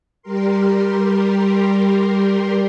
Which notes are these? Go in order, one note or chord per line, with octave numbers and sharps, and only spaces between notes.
G3 G4 A#4 C6